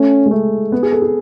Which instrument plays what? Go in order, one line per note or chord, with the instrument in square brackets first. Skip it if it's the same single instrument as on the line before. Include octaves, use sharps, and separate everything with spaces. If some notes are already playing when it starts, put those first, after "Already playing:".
Already playing: [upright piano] A3 [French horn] C#4
[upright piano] G#3
A3
B3
G#4
A4
G#4